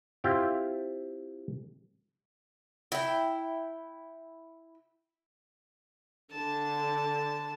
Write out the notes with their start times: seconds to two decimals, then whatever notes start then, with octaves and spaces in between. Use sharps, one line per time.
0.24 C4 E4 F4 G4 F5 G5
2.92 E4 G5
6.31 D3 A5